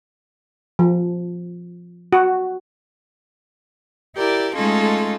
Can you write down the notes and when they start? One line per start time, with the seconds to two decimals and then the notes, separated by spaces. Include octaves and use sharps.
0.79 F3
2.13 F#4
4.15 E4 G4 A#4 D5
4.55 G#3 A3 C#4 D#4 F4 A4